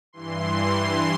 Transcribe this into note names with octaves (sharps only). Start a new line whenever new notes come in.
G2 E3 C6